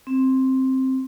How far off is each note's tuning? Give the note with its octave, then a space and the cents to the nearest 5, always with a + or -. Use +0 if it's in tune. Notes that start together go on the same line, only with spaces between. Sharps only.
C4 +5